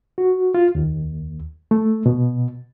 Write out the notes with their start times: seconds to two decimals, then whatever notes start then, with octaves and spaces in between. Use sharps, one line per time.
0.18 F#4
0.54 F4
0.75 D#2
1.71 A3
2.06 B2